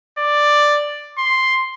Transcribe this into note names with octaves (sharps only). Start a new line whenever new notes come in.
D5
C6